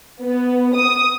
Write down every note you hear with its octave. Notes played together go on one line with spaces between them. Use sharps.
B3
D#6